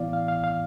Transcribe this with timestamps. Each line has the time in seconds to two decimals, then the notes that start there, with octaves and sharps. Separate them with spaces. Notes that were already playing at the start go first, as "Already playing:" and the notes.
Already playing: A2 E3 B3 E4 D5 F5
0.13 F5
0.28 F5
0.44 F5